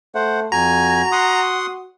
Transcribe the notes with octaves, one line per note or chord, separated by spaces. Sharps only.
A3 C5 F#5
F2 F#4 G#5 A#5
F#5 C6 D#6